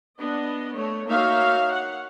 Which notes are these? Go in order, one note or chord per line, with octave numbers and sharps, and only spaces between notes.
B3 D4 D#5
A3 C#5
A#3 D#4 F#4 C#5 E5 F5
F#5